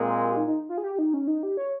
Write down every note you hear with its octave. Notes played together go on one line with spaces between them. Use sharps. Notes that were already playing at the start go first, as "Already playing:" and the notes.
Already playing: A#2 G#3 C4 A#4
G4
D#4
D#4
F4
G#4
G4
D#4
C#4
D#4
G4
C#5